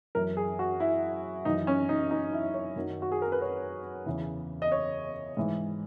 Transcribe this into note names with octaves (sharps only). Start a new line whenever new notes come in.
F#2 E3 A#4
G#4
F#4
E4
F#2 E3 D#4
C#4
D#4
D#4
E4
C#5
F#2 D#3 F#3
F#4
G#4
A#4
B4
C#5
E2 C#3 E3
D#5
C#5
G#2 E3